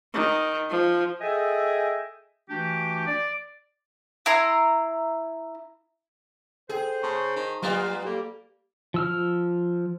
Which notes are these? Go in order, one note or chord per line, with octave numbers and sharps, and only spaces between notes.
D#3
F3
G#4 A4 D#5 E5 G5 G#5
E3 A3 D4 F#4 G4
D5
E4 A#5 C6
G#4 A4 C5 G5
C#3 A5 C6 C#6
D#3
F#3 G3 A#3 B3 F4
G3 A#3 G4 A4
F3 E6 F6